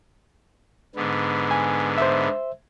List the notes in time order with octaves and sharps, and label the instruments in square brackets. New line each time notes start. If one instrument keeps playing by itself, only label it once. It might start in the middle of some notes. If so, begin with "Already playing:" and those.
[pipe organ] G#2 D3 B3
[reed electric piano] G#5
C5 E5